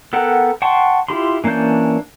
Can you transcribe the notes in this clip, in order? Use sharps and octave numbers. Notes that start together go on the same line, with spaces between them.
B3 A4 A#4 F#5 G5
F#5 G5 A5 C6 C#6
E4 F4 G4 B5 C6
E3 A#3 C#4 D4 G6